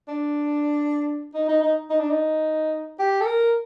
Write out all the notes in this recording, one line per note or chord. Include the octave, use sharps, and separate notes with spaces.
D4
D#4
D#4
D#4
D#4
D4
D#4
G4
A4
A#4